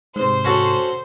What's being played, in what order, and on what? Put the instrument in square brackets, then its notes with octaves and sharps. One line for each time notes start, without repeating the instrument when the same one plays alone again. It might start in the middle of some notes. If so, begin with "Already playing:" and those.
[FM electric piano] G#2 C3 [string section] C5
[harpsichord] C#4 F#4 A4